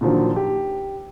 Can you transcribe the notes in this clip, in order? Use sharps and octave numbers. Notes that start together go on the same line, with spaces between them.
A#2 D3 D#3 F3 F#3
G4